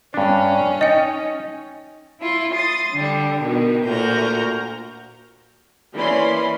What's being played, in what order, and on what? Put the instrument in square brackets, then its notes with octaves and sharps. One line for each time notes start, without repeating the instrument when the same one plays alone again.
[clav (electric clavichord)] G2 D4 [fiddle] C#4
[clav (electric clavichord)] D#4 [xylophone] D#5 G5
[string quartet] E4 F4 C6
C6 D#6 A6
D3 G3
B2 D#3
D2 A#2 F#4 A#4 A#5 G6
[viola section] E3 A#3 C#4 D5 B5 C6